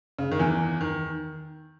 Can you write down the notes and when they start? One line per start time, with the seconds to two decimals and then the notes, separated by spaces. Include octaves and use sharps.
0.19 C#3
0.31 D#3
0.39 E2 E3
0.81 D#3